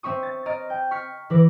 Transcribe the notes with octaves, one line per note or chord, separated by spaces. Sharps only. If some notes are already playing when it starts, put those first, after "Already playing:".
C4 E5 C#6 D#6
A6
D#5 A#5 F6 A6 D7 D#7
G5
C#6 F6 B6 C#7
E3 E4 B4 D6 A#6